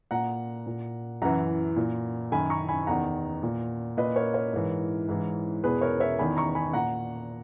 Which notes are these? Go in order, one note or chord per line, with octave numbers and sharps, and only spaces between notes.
A#2 F#5 A#5
A#2
F#2 E3 F#5 A#5
A#2
F#2 D#3 G#5 B5
A#5 C#6
G#5 B5
E2 D#3 F#5 A#5
A#2
A#2 B4 D#5
A#4 C#5
A#4 C#5
G#2 E3
G#2 E3
E2 B2 G#4 B4
A#4 C#5
C#5 E5
E2 D#3 G#5 B5
A#5 C#6
G#5 B5
A#2 F#5 A#5